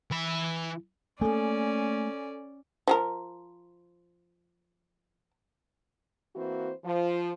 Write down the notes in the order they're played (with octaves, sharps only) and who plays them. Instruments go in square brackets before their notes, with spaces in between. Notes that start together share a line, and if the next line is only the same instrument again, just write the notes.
[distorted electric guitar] E3 B5
[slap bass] A3 A#3 [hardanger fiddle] C#4 D5 [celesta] A4 G#5
[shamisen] F3 G#4 A#4
[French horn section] E3 A#3 C4 F#4 C5
F3